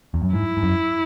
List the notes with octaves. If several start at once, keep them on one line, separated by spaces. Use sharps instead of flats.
E2
F#2
G#2 E4
G#2
F#2